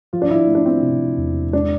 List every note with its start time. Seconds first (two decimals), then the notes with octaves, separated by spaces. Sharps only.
0.13 F3 F4
0.22 D4
0.31 E4
0.47 A3
0.55 D4
0.65 C4
0.83 C3
1.18 E2
1.53 G#3 D4